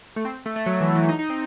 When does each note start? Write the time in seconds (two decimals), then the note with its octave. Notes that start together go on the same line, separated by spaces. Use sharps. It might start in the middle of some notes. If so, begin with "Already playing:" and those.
0.16 A3
0.25 C4
0.46 A3
0.56 A3
0.66 F#3
0.81 E3
0.95 E3
1.09 D#4
1.19 D#4
1.30 C4